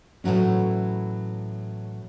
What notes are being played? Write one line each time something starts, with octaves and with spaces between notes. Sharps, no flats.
A2 E3 F#3 C#4